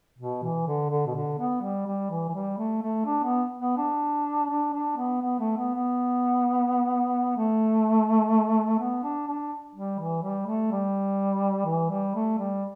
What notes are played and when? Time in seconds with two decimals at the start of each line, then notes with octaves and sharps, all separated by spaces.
0.18 B2
0.43 E3
0.67 D3
0.90 D3
1.06 B2
1.15 D3
1.39 B3
1.62 G3
1.86 G3
2.10 E3
2.29 E3
2.34 G3
2.58 A3
2.82 A3
3.05 D4
3.24 B3
3.59 B3
3.78 D4
4.50 D4
4.73 D4
4.97 B3
5.21 B3
5.39 A3
5.57 B3
5.75 B3
7.37 A3
8.79 B3
9.03 D4
9.28 D4
9.75 G3
9.99 E3
10.22 G3
10.46 A3
10.71 G3
11.66 E3
11.90 G3
12.15 A3
12.38 G3